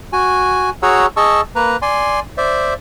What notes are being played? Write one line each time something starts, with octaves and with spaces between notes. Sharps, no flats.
F#4 G#5
F#4 G#4 C#5 F#5 A#5 E6
G#4 D#5 A5 C#6 E6
A#3 B4 A#5
D5 G#5 C6
C5 D5 E5